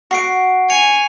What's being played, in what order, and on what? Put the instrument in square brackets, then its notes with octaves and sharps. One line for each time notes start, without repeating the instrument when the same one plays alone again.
[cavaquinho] F#4 F#5 [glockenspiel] C#6 C7 D7
[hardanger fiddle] G#5 [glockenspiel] C#7 F7